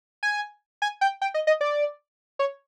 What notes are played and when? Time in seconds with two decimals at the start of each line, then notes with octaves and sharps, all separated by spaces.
0.23 G#5
0.82 G#5
1.01 G5
1.22 G5
1.34 D#5
1.47 D#5
1.61 D5
2.39 C#5